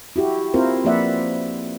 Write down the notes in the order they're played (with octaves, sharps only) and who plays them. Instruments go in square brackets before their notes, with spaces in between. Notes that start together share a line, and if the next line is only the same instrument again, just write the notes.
[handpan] E4 F#4 G4
C4 E4 F4 A#4 C5
F3 A#3 B4 D5 E5 F#5